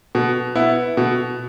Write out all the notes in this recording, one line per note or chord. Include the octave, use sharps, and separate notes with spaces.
B2
B3 E4
B2